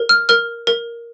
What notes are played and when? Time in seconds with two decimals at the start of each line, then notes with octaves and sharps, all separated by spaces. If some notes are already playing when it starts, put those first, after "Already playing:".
Already playing: A#4
0.09 F6
0.29 A#4 F6
0.67 A#4